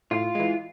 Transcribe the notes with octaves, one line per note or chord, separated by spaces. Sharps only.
A2 F4
E3 G#3